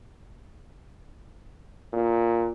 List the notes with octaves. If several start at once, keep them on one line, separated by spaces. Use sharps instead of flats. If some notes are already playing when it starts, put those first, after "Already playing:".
A#2